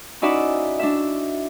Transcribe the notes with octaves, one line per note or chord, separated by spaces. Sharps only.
C#4 D#4 E4 F#4 D5 E5
D4 E5